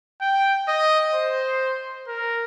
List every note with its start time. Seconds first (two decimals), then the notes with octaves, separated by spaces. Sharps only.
0.22 G5
0.68 D#5
1.14 C5
2.08 A#4